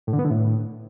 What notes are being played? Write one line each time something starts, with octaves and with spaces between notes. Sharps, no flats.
A2
D3
B3
D3
A2